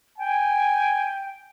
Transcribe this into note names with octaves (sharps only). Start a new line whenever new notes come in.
G5 G#5